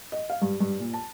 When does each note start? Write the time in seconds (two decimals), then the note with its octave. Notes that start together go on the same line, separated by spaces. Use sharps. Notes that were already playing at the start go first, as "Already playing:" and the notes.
0.12 D#5
0.30 F5
0.42 G2
0.60 G2
0.80 A#2
0.94 A5